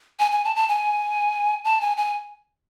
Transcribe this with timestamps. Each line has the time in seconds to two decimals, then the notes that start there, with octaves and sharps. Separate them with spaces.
0.19 G#5
0.31 G#5
0.45 A5
0.56 A5
0.68 G#5
1.65 A5
1.81 G#5
1.97 G#5